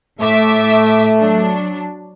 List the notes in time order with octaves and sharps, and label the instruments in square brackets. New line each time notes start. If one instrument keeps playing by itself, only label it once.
[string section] A2 E5 D6 [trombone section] A3
[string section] F#3 D4